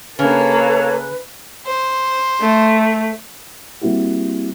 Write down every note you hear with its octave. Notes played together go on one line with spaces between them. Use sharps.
C#3 A#3 A4 B4 C#5
C5
A3
G3 A#3 C4 E4 F#4 G4